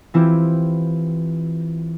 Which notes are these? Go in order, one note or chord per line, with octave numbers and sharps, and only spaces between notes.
E3 C4 E4 F4 G4